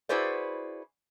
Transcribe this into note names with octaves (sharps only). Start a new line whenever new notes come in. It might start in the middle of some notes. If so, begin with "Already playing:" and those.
E4 F#4 G#4 B4 C5 D5